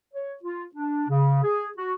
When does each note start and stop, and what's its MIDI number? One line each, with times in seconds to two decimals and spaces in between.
0.13 0.34 73
0.43 0.64 65
0.75 1.04 62
1.09 1.41 49
1.43 1.69 68
1.77 1.93 66